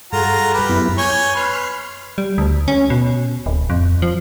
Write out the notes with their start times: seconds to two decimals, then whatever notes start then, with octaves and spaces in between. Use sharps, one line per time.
0.12 G2 F4 F#4 G#4 A4 A#5
0.54 G4 B4
0.69 F#2 B3 E4
0.98 C#5 G#5 G6
1.35 B4 C6 F6
2.18 G3
2.38 D2
2.68 C#4
2.90 B2
3.46 D1
3.70 F2
4.02 F3